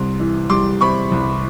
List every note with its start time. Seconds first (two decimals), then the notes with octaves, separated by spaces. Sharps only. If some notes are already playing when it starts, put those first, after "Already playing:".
Already playing: C2 C3 G3 C6
0.20 E3
0.50 G3 C6 D6
0.81 C3 B5 C#6
1.12 C2